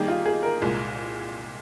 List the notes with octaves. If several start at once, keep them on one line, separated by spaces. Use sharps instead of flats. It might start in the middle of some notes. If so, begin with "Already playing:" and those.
Already playing: D#3 G3 A#3 D#4 G4 G#4
F4
G#4
A#4
C2 A#2 G#3